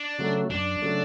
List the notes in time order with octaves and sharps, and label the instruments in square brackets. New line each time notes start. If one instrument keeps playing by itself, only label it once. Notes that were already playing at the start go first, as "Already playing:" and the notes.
Already playing: [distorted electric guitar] D4
[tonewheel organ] C#3 F#3 A3
[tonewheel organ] F#2 [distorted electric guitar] D4
[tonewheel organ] C#3 F#3 A3